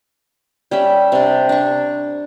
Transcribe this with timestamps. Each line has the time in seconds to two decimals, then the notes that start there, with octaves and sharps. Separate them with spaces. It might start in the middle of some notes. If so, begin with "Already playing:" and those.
0.71 G3 C#4 E5
1.12 C3 D4
1.49 D4 C#6